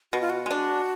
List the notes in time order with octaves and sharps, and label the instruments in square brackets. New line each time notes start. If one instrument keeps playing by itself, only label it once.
[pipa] B2 [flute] F#4
[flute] F4
F#4
[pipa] G#3 D4